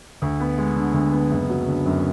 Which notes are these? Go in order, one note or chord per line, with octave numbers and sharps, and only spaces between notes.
D2
B3
G#3
D3
D2
B3
F#1
F#3
D3
F#2